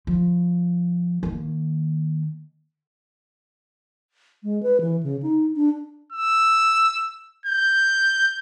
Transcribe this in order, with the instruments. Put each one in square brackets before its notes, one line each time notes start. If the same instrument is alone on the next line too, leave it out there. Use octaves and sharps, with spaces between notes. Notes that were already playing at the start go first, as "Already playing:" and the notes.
[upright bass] F3
D#3 A#3
[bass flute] G#3
B4
E3
C#3
D#4
D4
[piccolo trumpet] E6
G6